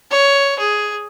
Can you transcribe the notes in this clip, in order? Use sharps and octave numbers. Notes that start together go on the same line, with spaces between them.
C#5
G#4